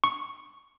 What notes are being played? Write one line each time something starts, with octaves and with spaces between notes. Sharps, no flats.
C#6